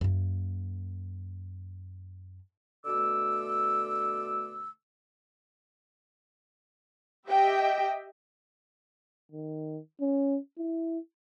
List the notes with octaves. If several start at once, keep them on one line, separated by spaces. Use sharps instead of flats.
F#2 A#3
B2 D3 A3 D6 E6
G4 D#5 E5 G5
D#3
C#4
E4